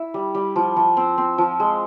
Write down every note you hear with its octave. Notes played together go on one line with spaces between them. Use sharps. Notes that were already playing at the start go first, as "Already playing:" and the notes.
Already playing: E4 E5
G3
G3
F3
F3
C4
C4
F3
G#3